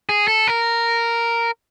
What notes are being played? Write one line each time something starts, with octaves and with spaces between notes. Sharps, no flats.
G#4
A4
A#4